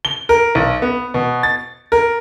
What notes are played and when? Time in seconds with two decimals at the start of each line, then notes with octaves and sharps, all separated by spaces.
0.05 G7
0.29 A#4
0.55 B1
0.82 B3
1.14 B2
1.43 A6
1.92 A#4